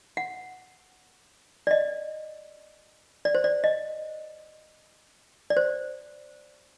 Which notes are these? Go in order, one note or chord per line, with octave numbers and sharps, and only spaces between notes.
F#5
D5
D#5
D5
C5
D5
D#5
D5
C5